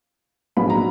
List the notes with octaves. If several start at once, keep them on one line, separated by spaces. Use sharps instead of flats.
A#1 G#2 F#3 B3 B5
A#5